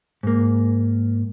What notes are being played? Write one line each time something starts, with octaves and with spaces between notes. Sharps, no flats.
G#2 A#3